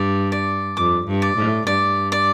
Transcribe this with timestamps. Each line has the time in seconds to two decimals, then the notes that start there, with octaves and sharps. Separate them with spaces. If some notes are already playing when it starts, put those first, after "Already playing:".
Already playing: G2 D5
0.32 D5
0.77 F2 D6
1.07 G2
1.22 D5
1.37 A2
1.67 G2 D5
2.12 D5